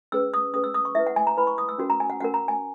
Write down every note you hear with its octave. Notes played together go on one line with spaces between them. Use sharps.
C#4 G#4 B4 E6
D#6
C#4 G#4 B4 D#6
E6
D#6
C#6
E4 B4 E5
F#5
G#5
A#5
E4 B4 B5
C#6
D#6
E6
C#4 F#4 A#4
A#5
G#5
F#5
C#4 F#4 A#4 F#5
A#5
G#5